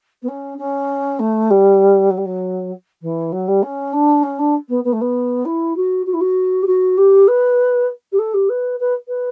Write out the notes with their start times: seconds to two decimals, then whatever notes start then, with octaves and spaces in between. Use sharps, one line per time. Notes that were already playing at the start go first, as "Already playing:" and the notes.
0.22 B3
0.28 C#4
0.58 C#4
1.19 A3
1.50 G3
2.10 F#3
2.17 G3
2.25 F#3
3.02 E3
3.32 F#3
3.47 G3
3.62 C#4
3.93 D4
4.23 C#4
4.39 D4
4.69 B3
4.84 B3
4.92 A3
5.01 B3
5.45 E4
5.76 F#4
6.06 F#4
6.13 E4
6.20 F#4
6.62 G4
6.66 F#4
6.97 G4
7.27 B4
8.12 G4
8.18 A4
8.34 G4
8.49 B4
8.80 B4
9.08 B4